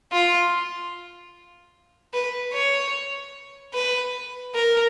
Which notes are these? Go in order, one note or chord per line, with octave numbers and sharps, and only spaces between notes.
F4
B4
C#5
B4
A#4